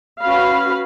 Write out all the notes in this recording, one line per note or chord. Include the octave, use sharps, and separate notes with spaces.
C#4 F#4 B4 F5 B5